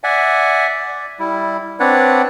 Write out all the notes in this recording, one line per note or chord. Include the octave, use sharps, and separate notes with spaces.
D5 E5 F#5 G#5
D5
G3 E4
C4 D4 B4 C#5 D5 F#5